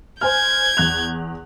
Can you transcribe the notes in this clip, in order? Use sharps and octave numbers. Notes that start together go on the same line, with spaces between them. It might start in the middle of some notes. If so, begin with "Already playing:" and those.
C5 G#5 F6 G6 G#6
E2 F#6 F7